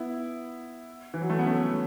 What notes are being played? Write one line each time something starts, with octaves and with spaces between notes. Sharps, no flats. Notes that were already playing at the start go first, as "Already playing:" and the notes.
Already playing: B3 E4
E3
F#3
A3
B3
A3 C#4